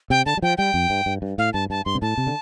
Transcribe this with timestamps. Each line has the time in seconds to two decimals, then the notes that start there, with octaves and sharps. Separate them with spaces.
0.10 C3 G5
0.26 D3 A5
0.37 G3
0.42 F3 G5
0.58 G3 G5
0.74 F2
0.90 G2
1.06 G2
1.22 G2
1.38 A2 F5
1.53 G2 A5
1.70 G2 A5
1.85 G2 C6
1.95 C3
2.02 A2 A5
2.18 C3
2.27 D3